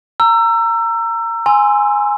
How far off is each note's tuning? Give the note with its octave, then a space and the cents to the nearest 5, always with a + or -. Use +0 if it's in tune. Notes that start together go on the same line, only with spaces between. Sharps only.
A#5 -15 E6 +25
G#5 +0 C6 +0 E6 +0